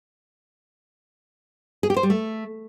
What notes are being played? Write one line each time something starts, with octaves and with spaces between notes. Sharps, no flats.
G#4
G4
C5
G3
A3